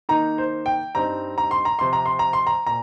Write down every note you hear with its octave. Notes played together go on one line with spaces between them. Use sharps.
D#3 A#3 D#4 A#5
C5
G5
G2 G3 C4 D#4 A#5
A#5
C6
A#5
C3 F3 C4 C6
A#5
C6
A#5
C6
A#5
A#2 A#5